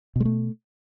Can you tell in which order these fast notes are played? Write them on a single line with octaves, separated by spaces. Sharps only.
B2 G#3 A3